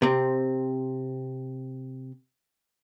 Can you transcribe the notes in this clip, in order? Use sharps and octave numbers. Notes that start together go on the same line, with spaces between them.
C3 C4